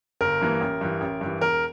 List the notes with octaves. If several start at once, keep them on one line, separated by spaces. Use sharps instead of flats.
G1 A#4
G2 E3 A#3
A1
G2 E3
A1
G2
E3
E1 A#4